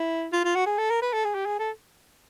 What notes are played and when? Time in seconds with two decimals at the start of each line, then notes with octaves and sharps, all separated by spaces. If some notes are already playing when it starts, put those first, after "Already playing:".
Already playing: E4
0.33 F4
0.44 F4
0.55 F#4
0.66 G#4
0.78 A4
0.91 A#4
1.02 B4
1.13 A4
1.25 G#4
1.35 G4
1.46 G#4
1.59 A4